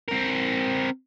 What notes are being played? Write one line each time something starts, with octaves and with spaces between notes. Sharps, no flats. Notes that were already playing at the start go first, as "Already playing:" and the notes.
C4 A#4